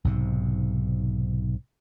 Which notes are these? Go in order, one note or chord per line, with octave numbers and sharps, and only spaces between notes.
B1 G#2 C3